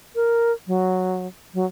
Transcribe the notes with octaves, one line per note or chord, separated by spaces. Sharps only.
A#4
F#3
F#3